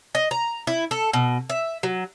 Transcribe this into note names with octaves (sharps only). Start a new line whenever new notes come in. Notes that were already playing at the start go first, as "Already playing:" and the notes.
D#5
A#5
E4
A4
B2
E5
F#3